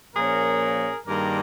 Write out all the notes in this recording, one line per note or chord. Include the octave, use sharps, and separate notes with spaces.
A#2 F3 A#3 C#4 G#4 A#4
G2 D#3 G3 A#3 D4 G#4 A#4